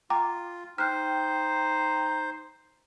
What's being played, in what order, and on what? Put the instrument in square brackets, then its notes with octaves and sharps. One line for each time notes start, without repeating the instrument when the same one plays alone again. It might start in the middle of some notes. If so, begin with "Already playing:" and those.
[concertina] F4 [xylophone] G5 A#5 D6
[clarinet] D#4 [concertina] C5 [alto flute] G5 [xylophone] F6 F#6